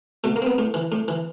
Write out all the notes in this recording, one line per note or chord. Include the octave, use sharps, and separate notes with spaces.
B2 A3
A#3
C4
B3
A2
E3
A2
E3